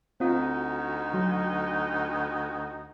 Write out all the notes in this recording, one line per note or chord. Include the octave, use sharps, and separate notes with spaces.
D2 C4 D#4 F4 F#4
F#3